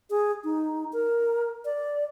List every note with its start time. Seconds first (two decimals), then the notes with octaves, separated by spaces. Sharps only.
0.10 G#4
0.44 D#4
0.93 A#4
1.65 D5